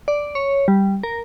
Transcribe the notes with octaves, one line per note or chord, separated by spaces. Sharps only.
D5
C#5
G3
A#4